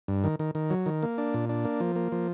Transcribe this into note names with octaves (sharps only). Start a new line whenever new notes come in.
G2
D#3
D#3
D#3
F#3
D#3
A#3
D4
A#2
D4
A#3
F3
A#3
F3